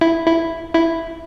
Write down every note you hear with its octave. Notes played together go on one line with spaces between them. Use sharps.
E4
E4
E4